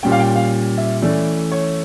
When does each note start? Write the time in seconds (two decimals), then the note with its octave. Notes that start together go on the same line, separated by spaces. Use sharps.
0.03 A#2 G3 C#4 G5
0.12 F5
0.20 G5
0.36 F5
0.78 E5
1.02 E3 A3 C#4 D5
1.52 C#5